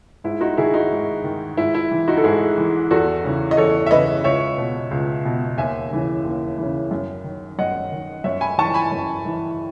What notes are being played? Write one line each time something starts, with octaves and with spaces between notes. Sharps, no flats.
G#2 E4
D#4 F#4
D#3 E4 G#4
D#4 F#4
G#2
D#3
G#2 E4
E4
E3
D#4 F#4
A4
G#2 E4 G#4
E3
E2 F#4 A4
C#3 E3
D#5
E2 A4 C#5
E5
C#3 E3 B4 D#5
C#2 C#5 E5
B2
C#2
B2
D#2 E5 G#5
C#3 E3
D#2
C#3 E3
F#2
D#3
F#2 D#5 F#5
D#3
F#2 C#5 E5
G#5 B5
E3 A5 C#6
G#5 B5
F#2
E3